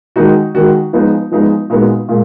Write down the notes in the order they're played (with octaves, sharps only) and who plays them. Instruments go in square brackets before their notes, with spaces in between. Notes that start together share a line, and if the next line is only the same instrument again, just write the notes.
[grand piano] D#3 G#3 D#4 F#4
D#3 G#3 D#4 F#4
F3 G#3 B3 D#4
F3 G#3 B3 D#4
A#2 G#3 B3 D#4 F#4
A#2 G#3